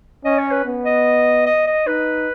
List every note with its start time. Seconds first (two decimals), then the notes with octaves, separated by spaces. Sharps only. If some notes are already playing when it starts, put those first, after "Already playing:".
0.24 C#4 D#5
0.38 C#5
0.51 B4
0.65 B3
0.85 D#5
1.46 D#5
1.67 D#5
1.87 D#4 B4